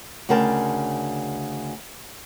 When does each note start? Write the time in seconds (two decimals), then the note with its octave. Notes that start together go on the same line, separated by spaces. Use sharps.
0.29 D2 C#3 A#4 G5 A5